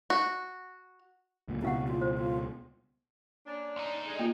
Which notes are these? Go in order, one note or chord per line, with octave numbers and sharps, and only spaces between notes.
F#4
C#2 A#2
C#2 B2 E4 F#4 F5 F#5
F4
C5
F4
A#3 C#4 D4
D2 D#4
D3 G3 G#3
A#3 F4